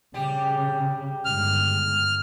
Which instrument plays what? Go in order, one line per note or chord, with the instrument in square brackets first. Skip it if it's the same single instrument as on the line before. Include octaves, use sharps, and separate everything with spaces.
[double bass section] C#3 [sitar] G3 G4
[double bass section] G1 G#2 [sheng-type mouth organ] F6